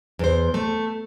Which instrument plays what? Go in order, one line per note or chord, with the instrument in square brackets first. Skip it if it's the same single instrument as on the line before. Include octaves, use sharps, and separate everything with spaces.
[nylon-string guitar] E2 C5
A3